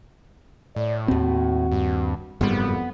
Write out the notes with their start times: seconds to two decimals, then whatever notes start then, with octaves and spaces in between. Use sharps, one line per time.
0.76 A2 D5
1.08 D#2 C4 F#4
1.72 G2
2.41 F#1 F2 G#2 G3 B3